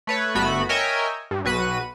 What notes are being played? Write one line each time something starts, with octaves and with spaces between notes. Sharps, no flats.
A3 B4 C#5
G1 A3 B3 F#4 B5
A#4 C#5 D#5 E5 G5 G#5
G2
B1 F#4 B4 D#7